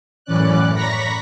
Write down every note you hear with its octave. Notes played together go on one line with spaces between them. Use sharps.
F#2 A2 E3 C#4 D5 F#6
A#5 B5 C#6 A#6 B6